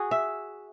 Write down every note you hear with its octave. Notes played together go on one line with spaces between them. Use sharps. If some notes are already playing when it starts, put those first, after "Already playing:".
Already playing: F#4 G#4
E5